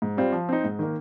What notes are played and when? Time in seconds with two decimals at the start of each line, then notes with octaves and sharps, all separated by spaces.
0.02 G#2
0.17 G3 C4 F4
0.32 F3
0.49 C4 D#4
0.64 G#2
0.79 D#3 A#3